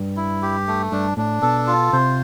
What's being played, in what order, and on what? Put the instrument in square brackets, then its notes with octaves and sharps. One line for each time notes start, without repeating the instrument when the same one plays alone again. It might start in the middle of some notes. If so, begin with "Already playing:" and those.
Already playing: [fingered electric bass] G2
[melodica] E4
G4
A3
[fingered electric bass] G2 [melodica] D4
[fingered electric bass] A2 [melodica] D4
[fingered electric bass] B2 [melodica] A4
[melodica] F4
[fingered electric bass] C3 [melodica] C5